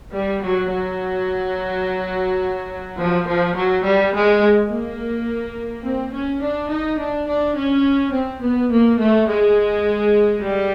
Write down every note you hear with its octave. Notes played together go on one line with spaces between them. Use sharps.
G3
F#3
F#3
F3
F3
F#3
G3
G#3
A#3
C4
C#4
D4
D#4
D4
D4
C#4
C4
B3
A#3
A3
G#3
G3